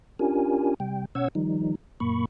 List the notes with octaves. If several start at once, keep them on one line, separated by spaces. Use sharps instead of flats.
C#4 D4 F4 G4 A#4 G#5
C3 G3 G5
B2 C#4 C#5 F#5 E6 G#6
D#3 F3 G3 D#4
F#2 A#2 A#3 B5 C#6